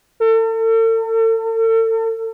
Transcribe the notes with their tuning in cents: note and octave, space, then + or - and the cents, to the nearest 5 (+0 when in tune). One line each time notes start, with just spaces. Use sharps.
A4 +40